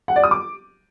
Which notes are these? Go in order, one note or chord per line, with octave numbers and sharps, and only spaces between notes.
F#5
D5
D#6
D6